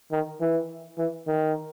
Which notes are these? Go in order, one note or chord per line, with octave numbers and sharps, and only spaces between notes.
D#3
E3
E3
D#3